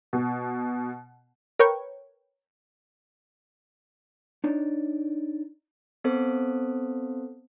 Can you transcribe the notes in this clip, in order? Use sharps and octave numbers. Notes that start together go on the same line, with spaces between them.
B2
A#4 B4 C#5 G5 C#6
D4 D#4 C#5 D5
B3 C4 A4 C5